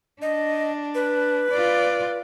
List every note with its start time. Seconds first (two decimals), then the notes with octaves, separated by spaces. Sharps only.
0.22 D4 D#5
0.95 B4
1.51 F4 D5